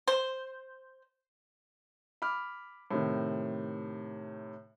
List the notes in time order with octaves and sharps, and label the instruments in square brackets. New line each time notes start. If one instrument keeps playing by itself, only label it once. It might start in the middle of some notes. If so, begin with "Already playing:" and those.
[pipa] C5
[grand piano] B5 D6 F6
A2 C3 D#3